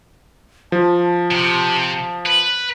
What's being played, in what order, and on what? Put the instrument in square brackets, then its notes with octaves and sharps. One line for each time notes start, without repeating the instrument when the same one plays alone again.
[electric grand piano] F3 [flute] A5
[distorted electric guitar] C3
B4